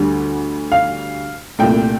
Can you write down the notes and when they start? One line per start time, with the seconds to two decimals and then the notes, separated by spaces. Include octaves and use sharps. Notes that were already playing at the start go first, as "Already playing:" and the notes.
Already playing: D2 D3 G3
0.72 F5
1.59 C2 A#2 A3 G5